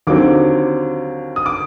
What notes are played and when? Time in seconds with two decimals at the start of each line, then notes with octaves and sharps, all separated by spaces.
0.07 D#2 D3 F#3 C4 D6
1.36 D#6
1.46 D6